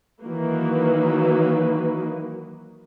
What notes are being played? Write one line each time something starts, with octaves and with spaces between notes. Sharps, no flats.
D#3 E3 F#3 A#3 F#4 B4